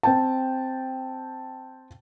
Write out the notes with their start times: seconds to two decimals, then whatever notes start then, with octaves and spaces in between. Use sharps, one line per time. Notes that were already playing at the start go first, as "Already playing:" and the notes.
0.03 C4 G5 A5